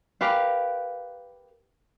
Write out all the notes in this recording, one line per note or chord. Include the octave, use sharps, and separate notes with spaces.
G4 A#4 B4 F5